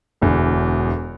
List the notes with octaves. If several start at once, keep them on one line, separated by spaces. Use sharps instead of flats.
E1 E2 D3